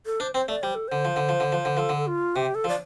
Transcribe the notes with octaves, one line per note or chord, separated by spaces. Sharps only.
A4
D4 C5
C4 C5
A3 D5
G3 C5
A4
D3 C5
F3
D3
F3
D3
F3
D3
F3 A4
D3
F4
C3 G4
A4
F3
D5